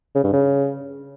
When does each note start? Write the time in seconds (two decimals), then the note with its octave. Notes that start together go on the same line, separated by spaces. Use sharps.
0.15 C#3
0.24 G2
0.33 C#3